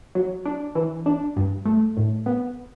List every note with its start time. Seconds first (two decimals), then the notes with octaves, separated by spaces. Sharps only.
0.15 F#3
0.45 D4
0.75 E3
1.06 D4
1.36 G2
1.65 A3
1.97 A2
2.26 B3